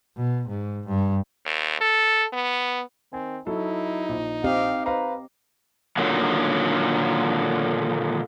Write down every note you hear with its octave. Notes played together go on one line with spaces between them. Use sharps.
B2
G#2
G2
D#2
A4
B3
D#3 C4 G#5
F#3 D#4 E4 A4
A#1
C4 G4 D#5 F5
B4 C5 F5 A#5
A#2 D3 D#3 F#3